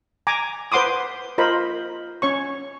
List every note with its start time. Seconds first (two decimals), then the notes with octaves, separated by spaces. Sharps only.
0.27 G#5 A#5 D6
0.72 B4 C5 F#5 C6 D6 D#6
1.38 F4 A#4 C5 D#5 B5
2.22 C#4 C#5 C#6